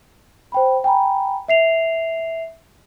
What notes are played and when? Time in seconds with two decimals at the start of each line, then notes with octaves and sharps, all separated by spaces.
0.52 C5 G5 B5
0.84 G5 G#5 A#5 B5
1.48 E5 C7 F7